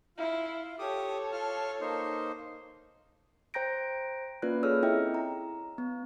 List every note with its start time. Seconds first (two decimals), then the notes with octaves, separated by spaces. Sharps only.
0.18 E4 F4
0.79 G4 A4 C#5 D6 D#6
1.32 F4 A5 F6
1.81 A#3 D#4 C5
3.54 C5 G5 A#5 G6 A#6 D7
4.42 A#3 C#4 F4 B4 D5 F#6
4.63 G#4 A4 C#5 E6 F6
4.83 C4 E4 D#5 E5 G5
5.15 A#5
5.78 B3